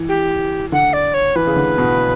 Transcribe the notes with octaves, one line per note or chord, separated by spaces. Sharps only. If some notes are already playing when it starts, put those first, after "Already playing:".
Already playing: E3
G4
D3 F#5
D5
C#5
E3 B4
C#3
D3
B2